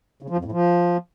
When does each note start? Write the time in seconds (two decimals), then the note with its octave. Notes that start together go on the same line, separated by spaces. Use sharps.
0.22 C#3
0.30 F3
0.37 F2
0.45 A2
0.52 F3